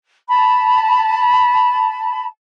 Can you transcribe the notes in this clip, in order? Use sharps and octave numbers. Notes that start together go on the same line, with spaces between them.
A5 B5